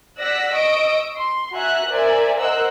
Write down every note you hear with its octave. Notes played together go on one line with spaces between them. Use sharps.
D5 F#5 E6 F#6 A#6 B6
D#5 C#6 D#6 E6 D7
C6
F#4 E5 G#5 A#5 F#6
A#4 C5 D5 E5 G#5
A#4 C5 D#5 F#5 E6 F#6